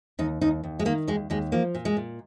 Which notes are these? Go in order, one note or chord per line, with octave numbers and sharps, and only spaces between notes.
D#2 D#4
D#2 D#4
D#2
G#3
D#3 A#3
D#2 G#3
D#2 G#3
F3 A#3
A#2
G#3
A#2